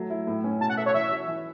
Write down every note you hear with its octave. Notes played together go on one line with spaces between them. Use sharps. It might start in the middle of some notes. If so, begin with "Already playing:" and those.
Already playing: F#3 A3
E4
A2
C#4
B2 A5
F#5
A4 E5
C#5
E3 E5
F#4
E3